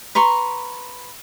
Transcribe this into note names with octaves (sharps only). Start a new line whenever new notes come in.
B4 A#5 C6 C#6